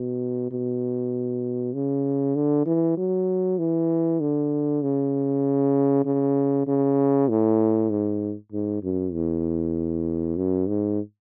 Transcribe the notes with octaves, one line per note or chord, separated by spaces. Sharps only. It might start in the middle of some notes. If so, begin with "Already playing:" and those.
Already playing: B2
B2
C#3
D3
E3
F#3
E3
D3
C#3
C#3
C#3
A2
G#2
G#2
F#2
E2
F#2
G#2